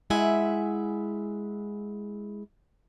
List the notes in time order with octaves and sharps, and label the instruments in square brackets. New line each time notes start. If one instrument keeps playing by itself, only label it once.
[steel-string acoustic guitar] G#3 E4 E5 F#5 G#5